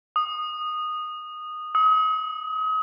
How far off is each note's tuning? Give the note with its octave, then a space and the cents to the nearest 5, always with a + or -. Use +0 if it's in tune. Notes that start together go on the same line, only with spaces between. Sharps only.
D#6 -15
D#6 +35